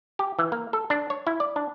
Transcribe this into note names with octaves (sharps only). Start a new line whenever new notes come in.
G4
E3
A#3
A4
D4
C#5
E4
D5
D4